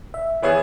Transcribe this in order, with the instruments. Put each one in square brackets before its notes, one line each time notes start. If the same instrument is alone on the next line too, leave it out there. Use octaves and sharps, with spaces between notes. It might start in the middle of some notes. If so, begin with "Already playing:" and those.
[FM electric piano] E5
[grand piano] E3 B3 E4 G#4 [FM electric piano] C#5